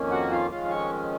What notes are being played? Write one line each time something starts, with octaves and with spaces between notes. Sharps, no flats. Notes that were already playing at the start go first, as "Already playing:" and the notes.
Already playing: F2 D#3 A#3 C#4
F#4 F#5
F4 F5
F2 D#3 G#3 C#4 F4 F5
C#5 C#6